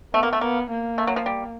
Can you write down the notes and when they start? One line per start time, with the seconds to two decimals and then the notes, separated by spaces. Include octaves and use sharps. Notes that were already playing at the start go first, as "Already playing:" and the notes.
0.13 A3 B3
0.23 A#3
0.33 A3
0.41 A#3 B3
0.70 A#3
0.98 A3
1.07 F#3
1.16 F3
1.26 G3